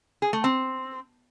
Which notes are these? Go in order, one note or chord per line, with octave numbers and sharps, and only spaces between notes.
G#4
A3
C4